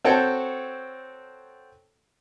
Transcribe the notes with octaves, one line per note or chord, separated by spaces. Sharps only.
C4 F#4 A4 C#5 G5 A5